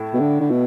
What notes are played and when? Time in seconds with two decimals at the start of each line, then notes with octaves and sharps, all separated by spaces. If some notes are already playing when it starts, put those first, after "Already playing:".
Already playing: A2 A3 E4
0.14 B2
0.20 D3
0.41 D3
0.50 B2